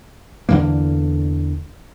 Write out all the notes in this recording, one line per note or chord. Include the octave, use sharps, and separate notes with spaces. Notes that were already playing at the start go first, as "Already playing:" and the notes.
E2 D3 E3 A#3